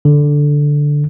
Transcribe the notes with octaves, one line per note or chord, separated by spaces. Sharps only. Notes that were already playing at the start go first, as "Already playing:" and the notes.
D3